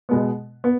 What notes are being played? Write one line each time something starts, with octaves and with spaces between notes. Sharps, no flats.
B2 G#3 B3
B3